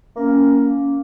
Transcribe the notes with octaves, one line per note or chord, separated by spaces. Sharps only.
A#3 C#4